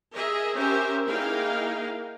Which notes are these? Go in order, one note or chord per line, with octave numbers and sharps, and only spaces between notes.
G#4 A#4 D#5 E5
C#4 G4 A#4 C5 E5
A#3 D#4 E4 G#4 F5 G5